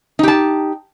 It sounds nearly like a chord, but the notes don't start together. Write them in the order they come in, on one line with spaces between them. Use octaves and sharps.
D#4 G4 A5